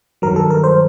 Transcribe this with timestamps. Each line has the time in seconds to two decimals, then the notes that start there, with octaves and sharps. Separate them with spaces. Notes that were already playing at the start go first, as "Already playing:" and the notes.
0.22 G2 D#3 F#3 A#4
0.36 A4
0.50 A#4
0.64 C5